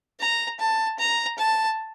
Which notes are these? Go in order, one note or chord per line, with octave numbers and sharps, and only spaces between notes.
A#5
A5
A#5
A5